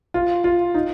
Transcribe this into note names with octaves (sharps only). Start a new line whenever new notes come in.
F4
F4
D#4